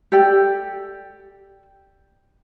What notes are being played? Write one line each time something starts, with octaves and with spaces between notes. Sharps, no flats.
G4 A4 D5 G5